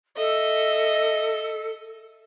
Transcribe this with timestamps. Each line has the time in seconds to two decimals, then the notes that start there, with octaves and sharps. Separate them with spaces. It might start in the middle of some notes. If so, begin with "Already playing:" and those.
0.16 A4 D#5 E5